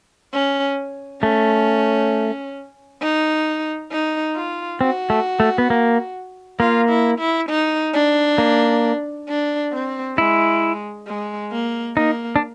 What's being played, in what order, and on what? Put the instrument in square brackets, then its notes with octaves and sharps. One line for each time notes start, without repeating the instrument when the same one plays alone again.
[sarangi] C#4
[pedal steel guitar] A3 [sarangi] C#4
[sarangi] D#4
D#4
F4
[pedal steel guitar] C4 [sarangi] F#4
[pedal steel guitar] A3
A3
B3
A#3
[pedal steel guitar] A#3 [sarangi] F4
[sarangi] E4
E4
D#4
D4
[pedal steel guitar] A#3
[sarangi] D4
C4
[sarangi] G#3 [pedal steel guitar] E4
[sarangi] G#3
A#3
[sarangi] A#3 [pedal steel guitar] D#4
[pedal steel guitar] D4